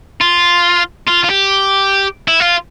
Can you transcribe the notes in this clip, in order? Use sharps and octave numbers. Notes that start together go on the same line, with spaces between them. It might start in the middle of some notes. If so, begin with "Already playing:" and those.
F4
F4
F4
G4
E4
F4